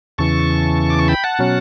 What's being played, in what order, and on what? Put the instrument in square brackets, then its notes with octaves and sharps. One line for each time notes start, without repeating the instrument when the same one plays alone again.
[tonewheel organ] E2 C#3 E3 A5 C#6
D6
C#6
G5 B5
F#5 A5
B2 F#3 C#4